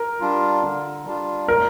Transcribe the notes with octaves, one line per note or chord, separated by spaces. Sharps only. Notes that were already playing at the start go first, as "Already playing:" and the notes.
Already playing: A#4
G3 D4 F4
D3
G3 D4 F4
A2 A#4